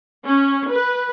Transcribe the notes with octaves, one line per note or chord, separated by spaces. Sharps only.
C#4
B4